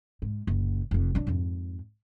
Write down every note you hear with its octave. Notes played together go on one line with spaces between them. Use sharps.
G#2
F#1 A#2
F1 F2
F#3 D4
F2 G#2